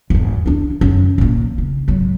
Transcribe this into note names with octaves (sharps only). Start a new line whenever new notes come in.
G#1 E2
D4 E4
F#2
A#2 A#3
C#3
G#1 F#3